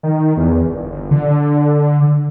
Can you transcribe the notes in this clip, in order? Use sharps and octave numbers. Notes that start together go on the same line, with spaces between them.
D#3
E2
G1
D3